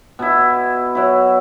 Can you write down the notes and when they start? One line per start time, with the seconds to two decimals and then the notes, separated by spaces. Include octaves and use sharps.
0.19 B2 E4
0.95 F#3 E4